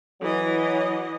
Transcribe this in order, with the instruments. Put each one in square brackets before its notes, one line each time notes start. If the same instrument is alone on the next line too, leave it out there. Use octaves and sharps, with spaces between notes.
[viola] E3 D#5 [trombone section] F#3